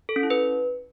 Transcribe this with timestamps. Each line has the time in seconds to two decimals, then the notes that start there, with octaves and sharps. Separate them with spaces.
0.09 A4
0.16 C#4
0.23 E4
0.30 B4